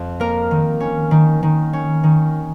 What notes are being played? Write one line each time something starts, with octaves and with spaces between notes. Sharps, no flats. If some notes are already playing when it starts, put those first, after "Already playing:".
Already playing: F2
A#3 A#4
D#3
C#4
D#3
D#3
C#4
D#3